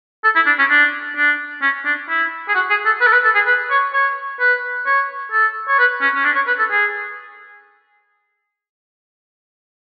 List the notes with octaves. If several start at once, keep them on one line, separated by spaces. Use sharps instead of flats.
A4
E4
D4
C#4
D4
D4
C#4
D4
E4
G#4
F#4
G#4
A4
B4
A4
B4
A4
G#4
B4
C#5
C#5
B4
C#5
A4
C#5
B4
C#4
C#4
D4
C#5
B4
A4
G#4